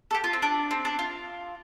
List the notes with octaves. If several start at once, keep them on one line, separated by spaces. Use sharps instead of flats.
A4
G4
F4
C4
D4
C4
D4
F4